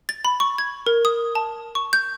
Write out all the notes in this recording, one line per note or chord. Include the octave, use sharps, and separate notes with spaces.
A6
B5
C#6
G#6
A#4
D#6
A5
C#6
G6